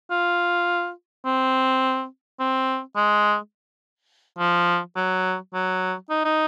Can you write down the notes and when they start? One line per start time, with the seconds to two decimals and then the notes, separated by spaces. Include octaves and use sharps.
0.11 F4
1.25 C4
2.40 C4
2.96 G#3
4.39 F3
4.96 F#3
5.54 F#3
6.10 D#4
6.25 D#4